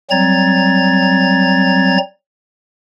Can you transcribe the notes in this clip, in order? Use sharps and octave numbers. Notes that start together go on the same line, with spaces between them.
F#3 G3 C4 A#5 G#6 A6